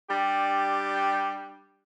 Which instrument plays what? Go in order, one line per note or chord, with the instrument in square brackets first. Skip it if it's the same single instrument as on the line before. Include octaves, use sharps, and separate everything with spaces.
[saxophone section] G3 D4 G4